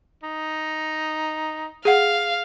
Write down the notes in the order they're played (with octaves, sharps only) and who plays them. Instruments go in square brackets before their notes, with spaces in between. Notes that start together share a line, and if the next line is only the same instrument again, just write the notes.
[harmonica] D#4
[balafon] G#4 F#5 [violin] F5